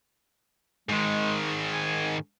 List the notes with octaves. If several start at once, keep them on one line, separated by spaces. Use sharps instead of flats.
G#2 D#3 G#3
G#5